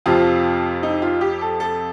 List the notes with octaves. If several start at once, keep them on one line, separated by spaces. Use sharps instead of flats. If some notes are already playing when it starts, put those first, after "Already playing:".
F2 C3 F3 F4
D#4
F4
G4
A4
A4